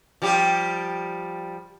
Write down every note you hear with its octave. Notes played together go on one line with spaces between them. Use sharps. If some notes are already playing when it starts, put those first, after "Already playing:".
F3 G3 G4